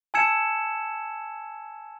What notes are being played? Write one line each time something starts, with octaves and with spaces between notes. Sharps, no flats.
G#5 A5 E6 G#6 C#7 E7